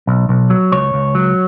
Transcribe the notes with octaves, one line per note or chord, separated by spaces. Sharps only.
B1
B1
F#3
C#2 C#5
C#2
F#3